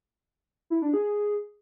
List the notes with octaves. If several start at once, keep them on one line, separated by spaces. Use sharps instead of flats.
E4
D4
G#4